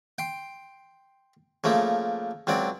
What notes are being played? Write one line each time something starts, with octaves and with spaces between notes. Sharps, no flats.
G5 C6
C#3 F3 A3 A#3
C#2 F#3 C4 D5